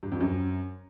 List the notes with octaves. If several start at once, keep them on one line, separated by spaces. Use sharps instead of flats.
G2
F2
F#2